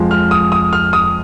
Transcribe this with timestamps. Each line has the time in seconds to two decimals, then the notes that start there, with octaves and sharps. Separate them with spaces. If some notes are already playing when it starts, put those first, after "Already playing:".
Already playing: F2 F3 G#3
0.11 F6
0.31 D#6
0.52 D#6
0.73 F6
0.93 D#6